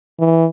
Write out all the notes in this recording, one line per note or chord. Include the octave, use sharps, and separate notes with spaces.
E3